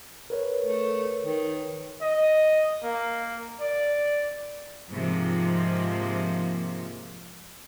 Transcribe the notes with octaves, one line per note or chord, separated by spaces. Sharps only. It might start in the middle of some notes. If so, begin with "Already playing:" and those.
A#4 B4 C#5
A3
D#3
D#5
A#3
D5
G#2 C3 F3 A#3